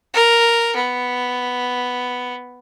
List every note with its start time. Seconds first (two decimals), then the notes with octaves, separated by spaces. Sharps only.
0.14 A#4
0.76 B3